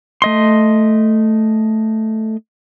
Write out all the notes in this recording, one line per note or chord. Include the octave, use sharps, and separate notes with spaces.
A3 D#5 C6